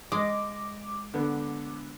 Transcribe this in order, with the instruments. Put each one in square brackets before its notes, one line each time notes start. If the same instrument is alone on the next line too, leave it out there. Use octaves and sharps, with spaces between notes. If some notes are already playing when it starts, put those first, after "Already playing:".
[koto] G#3 [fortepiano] D#5 [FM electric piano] D6
[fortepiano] D3 B3